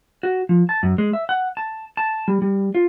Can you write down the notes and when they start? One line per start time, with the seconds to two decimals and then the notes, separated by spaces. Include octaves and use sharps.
0.23 F#4
0.49 F3
0.69 A5
0.83 F#2
0.98 G#3
1.13 E5
1.29 F#5
1.57 A5
1.97 A5
2.28 G3
2.42 G3
2.75 F4